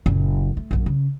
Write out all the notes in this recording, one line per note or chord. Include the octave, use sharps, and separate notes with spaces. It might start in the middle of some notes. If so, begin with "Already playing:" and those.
F#1 A#2
A3
A#1 F#2
C#3